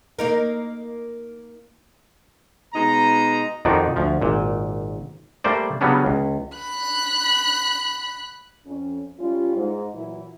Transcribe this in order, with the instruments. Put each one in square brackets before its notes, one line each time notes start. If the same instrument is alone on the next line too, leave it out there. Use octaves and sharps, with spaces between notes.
[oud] A#3 D#4 A#4
[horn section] B2 G#3 D#4 A#5
[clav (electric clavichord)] F2 D#3 F3 D#4 F#4 D5
D2 F3
G#1 A#2
G3 A3 A#3 C5 D5
C#3 F#3 G3 B3 C#4 D4
C#2
[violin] B5 F#6
[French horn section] F2 C#4
G3 C#4 F4
G#2
A#2 E3 F#3 E4